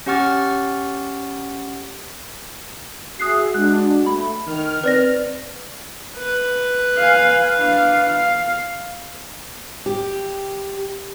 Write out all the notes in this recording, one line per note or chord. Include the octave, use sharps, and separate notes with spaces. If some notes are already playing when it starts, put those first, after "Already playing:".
C#4 G4 F#5 C#6 F6 A6
F#4 G#4 E5 D#6 F#6 C7
G#3 D4 F#6
A3 B5
D#3 F6
C4 B4 D5 A#6
B4
F5 G#5
D4 F5
F5
G4